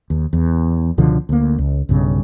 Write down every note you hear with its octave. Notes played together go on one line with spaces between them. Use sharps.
D#2
E2
C#2 B2 D3 F3
D2 A#3
C#2
B1 G2 C#3